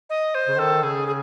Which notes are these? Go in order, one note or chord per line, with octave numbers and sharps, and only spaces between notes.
D#5
C5
C#3
D#3 A4
C#3 G#4
G#4